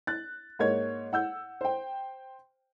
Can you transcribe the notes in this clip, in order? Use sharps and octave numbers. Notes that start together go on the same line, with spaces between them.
F#6 A6
G#2 A#3 C#5 G#6
F#5 E6 G6
C5 G5